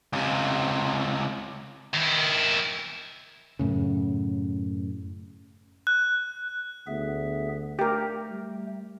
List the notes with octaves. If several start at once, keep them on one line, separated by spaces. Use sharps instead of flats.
C#2 C3
D#3 E4
F#2 A2 C#3
F#6
D2 B3 G#4 E5
A3 G4 A#4
G3